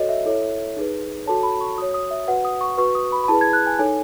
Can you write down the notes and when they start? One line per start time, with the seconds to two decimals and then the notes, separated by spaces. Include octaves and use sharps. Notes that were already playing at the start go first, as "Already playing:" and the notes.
Already playing: F#4 A4 C#5 D#5
0.09 E5
0.25 E4 A4 C#5
0.77 D#4 G#4 B4
1.26 F#4 A4 C#5 A5
1.43 B5
1.61 C#6
1.78 F#4 C#5 D#6
1.94 D#6
2.11 E5
2.27 F#4 B4 F#5
2.45 D#6
2.61 C#6
2.78 F#4 B4 C#6
2.95 D#6
3.12 B5
3.24 B5
3.28 E4 G#4 B4 A5
3.41 G#6
3.53 F#6
3.67 G#5
3.79 D#4 A4 C#5 G#5